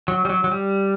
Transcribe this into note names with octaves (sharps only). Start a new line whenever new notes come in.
F#3
G3
F#3
F#3
G3